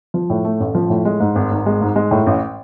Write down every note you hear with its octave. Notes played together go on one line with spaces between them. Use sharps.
F3
A2
A3
A1
F3
A2
G#3
G#2
G#1
G#1
G#3
G#2
G#3
A2
A1